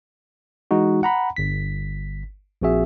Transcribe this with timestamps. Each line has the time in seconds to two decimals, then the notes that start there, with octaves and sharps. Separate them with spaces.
0.71 E3 G#3 D#4 F#4
1.03 F#5 A#5 B5
1.37 G1 B6
2.62 A#1 A#2 C4 F#4 G#4 E5